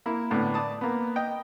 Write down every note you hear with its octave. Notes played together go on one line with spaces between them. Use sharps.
A#3 E4
A2 D3 A3 B3
D5 A5 D#6
A#3 B3
D#5 G5